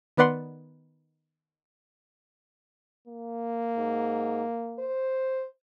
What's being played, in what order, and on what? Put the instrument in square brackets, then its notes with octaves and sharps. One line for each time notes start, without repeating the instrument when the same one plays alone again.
[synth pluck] D#3 B3 B4 D5 F#5 C6
[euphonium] A#3
[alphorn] G#2
C5